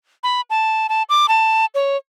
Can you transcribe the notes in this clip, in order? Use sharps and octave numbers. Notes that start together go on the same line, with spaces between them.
B5
A5
A5
D6
A5
C#5